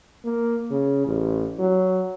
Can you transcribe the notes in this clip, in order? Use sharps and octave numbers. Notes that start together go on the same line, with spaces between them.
A#3
C#3
A1
F#3